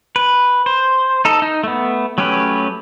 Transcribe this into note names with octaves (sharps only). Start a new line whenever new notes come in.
B4
C5
D#4 A4
D#4
A3 B3
F#3 A3 C#4 G4 B4